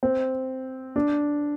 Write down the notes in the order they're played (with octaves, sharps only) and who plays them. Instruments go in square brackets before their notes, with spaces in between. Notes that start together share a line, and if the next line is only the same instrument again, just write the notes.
[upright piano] C4
D4